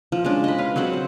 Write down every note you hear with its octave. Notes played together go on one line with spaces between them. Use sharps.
F3
F3 G#3 C#4 D4
D#5 B5
B4 F5
F#3 C4 C5 F#5
C5